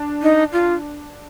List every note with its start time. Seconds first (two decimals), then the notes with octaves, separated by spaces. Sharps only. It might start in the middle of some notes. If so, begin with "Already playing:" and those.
Already playing: D4
0.22 D#4
0.52 F4